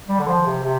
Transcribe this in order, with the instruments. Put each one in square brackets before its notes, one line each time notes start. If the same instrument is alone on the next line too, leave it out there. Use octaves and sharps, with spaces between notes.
[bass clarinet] G3
D3
F3
C3
C3